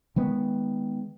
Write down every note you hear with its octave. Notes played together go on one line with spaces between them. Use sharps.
D#3 G#3 B3